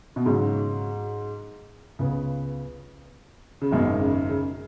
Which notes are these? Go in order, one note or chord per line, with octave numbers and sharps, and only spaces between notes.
B2
G#2 C#3 F#3 C#4
C#2 C#3 B3
C#3
G#1 F#2 B2 D#3 G#3 D#4
C#3
C#3